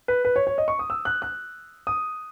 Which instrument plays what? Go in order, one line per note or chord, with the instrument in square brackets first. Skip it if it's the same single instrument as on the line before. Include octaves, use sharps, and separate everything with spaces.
[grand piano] B4
B4
C#5
C#5
D#5
C#6
D#6
E6
F#6
F#6
D#6